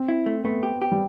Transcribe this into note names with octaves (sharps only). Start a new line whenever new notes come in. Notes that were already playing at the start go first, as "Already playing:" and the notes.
Already playing: C4
E4
A3
A3 B3
G4
G4
G3